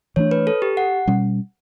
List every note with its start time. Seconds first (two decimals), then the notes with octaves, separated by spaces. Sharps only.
0.16 E3 A3 D4 C#5
0.31 B4
0.47 A4
0.62 G4
0.77 F#5
1.08 B2 G3 C#4